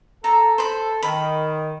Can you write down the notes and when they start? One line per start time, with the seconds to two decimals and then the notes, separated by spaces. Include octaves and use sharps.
0.24 A4 A5 A#5
0.58 C5 B5
1.03 D#3 B5